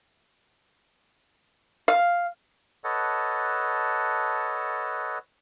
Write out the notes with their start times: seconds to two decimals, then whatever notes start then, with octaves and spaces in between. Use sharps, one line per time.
1.88 F5
2.84 A4 B4 C#5 D#5 F#5 A5